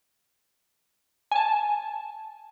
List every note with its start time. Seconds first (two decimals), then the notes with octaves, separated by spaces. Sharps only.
1.32 G#5 A5